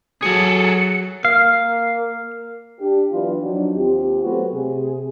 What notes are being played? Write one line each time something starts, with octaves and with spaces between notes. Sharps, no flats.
F#3 G#4 A4 C#7
A#3 F5
D4 G4
E3 F#3 B3 D4 F4
F3 F#3 D4 D#4 F#4
D#2 C4 F4 G4
F#3 A3 B3 F#4 C5
C3 G#4